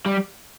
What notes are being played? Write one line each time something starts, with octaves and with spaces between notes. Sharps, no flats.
G3